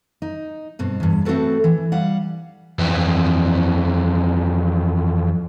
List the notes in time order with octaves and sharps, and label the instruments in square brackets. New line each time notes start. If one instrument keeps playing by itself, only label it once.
[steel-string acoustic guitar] D#4
G2 B2 C4
E2 G2
A3 C4 D#4 F#4 A4 B4
E3
G3 F5 F#5
[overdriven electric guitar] F2 E3